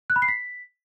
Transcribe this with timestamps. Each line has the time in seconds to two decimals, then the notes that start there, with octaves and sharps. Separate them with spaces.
0.10 F#6
0.16 B5
0.22 C7
0.28 B6